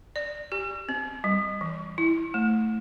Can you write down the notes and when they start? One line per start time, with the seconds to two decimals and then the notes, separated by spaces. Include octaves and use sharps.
0.16 D5
0.52 G4
0.89 C4
1.24 G3
1.61 E3
1.98 E4
2.34 A3